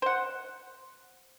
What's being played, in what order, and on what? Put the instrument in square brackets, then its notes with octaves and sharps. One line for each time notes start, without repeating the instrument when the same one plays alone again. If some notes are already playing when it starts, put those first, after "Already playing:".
[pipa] C5 F#5